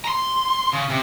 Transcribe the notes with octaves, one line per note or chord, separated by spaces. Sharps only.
A#5 C6
C#3
C3